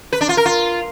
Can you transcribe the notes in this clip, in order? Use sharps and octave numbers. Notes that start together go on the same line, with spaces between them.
B4
D4
F4
A#4
F4